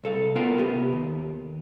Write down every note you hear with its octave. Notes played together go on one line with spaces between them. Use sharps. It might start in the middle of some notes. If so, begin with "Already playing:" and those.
C2 A4 F5
B3 F4 A#4 F5 G5
C3 B3 G4
D#2